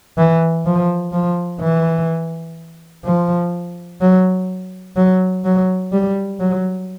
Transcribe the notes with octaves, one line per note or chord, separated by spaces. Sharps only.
E3
F3
F3
E3
F3
F#3
F#3
F#3
G3
F#3